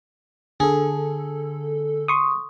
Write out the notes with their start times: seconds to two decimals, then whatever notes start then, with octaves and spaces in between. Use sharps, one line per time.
0.60 D3 G#4 A4
2.08 C6 C#6 D#6